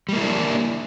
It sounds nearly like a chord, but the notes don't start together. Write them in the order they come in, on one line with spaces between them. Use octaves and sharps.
G3 A#3 E4 D4